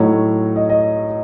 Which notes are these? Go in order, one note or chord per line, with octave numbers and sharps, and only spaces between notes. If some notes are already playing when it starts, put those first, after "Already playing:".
Already playing: A2 F#3 A3 D#4 C#5
D#5
D#5